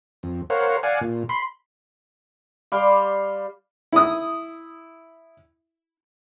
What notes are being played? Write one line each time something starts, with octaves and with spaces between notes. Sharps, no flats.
F2
A#4 C5 C#5 F5 F#5
D5 F5 F#5 G#5
A#2
B5 C6
G3 F5 C6 D6
E4 D#6